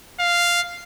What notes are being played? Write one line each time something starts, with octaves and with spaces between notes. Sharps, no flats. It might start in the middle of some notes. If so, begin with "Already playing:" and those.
F5